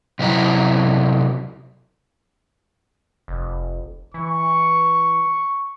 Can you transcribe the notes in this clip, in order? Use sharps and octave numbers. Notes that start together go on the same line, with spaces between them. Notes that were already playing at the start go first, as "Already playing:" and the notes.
C3 F#3 E4 A#5
F1
E3 C#6